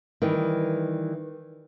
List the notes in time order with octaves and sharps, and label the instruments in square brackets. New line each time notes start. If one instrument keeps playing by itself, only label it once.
[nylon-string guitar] D#3 E3 G3